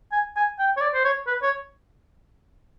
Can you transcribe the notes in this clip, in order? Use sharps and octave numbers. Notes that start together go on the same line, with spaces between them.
G#5
G#5
G5
C#5
D5
C5
C#5
B4
C#5